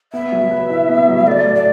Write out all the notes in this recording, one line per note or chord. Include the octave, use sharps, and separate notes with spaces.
B3 E5
F#3
B4
E4
B3
F#3
A3 D5
A2
D5